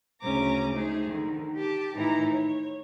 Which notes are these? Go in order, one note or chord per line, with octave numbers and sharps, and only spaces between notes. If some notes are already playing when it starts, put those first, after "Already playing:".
D2 C#3 C#4 A#5 D6
A3 D#4 G#4 C5
D3 D#3
G4 A5 D6
A2 D#3 E3 D#4 E4 A#5
C#5